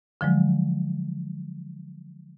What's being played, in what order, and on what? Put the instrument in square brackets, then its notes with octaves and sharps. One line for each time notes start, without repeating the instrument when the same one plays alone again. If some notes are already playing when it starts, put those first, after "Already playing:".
[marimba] D3 F3 F#3 G#3